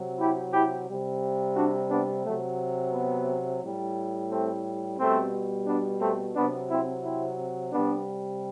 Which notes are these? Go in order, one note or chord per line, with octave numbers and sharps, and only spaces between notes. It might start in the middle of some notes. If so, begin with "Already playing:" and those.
Already playing: C3 F#3
E4 G4
E4 G4
C3 G3
D4 F#4
B3 D4
C3 F#3 A3
B3
A2 G3
A3 C4
B2 G3 A3 C4
B3 D4
A3 C4
C3 F#3 B3 D4
C4 E4
C4 E4
C3 G3 B3 D4